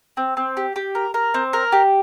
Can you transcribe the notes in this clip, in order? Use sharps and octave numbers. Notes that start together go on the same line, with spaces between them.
C4
C4
G4
G4
A#4
A#4
C4
A#4
G4